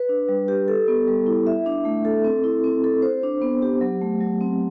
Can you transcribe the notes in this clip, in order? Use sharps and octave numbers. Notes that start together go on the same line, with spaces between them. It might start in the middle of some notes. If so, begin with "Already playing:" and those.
Already playing: B4
D4
G3
G4
A4
B3
G3
E4
E5
D4
A3
A4
C4
E4
C4
A4
C5
D4
B3
G4
F#3
A3
F#3
C4